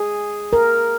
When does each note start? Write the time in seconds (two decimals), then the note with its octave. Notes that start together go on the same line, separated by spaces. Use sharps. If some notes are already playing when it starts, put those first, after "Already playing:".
Already playing: G#4
0.53 A#4